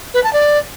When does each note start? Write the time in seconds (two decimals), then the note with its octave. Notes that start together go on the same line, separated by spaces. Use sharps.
0.14 B4
0.24 A5
0.33 D5